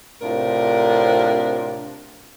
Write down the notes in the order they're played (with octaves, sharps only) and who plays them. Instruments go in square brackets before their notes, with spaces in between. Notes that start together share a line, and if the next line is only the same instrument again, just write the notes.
[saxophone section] A2 C3 C4 D4 F4 A#4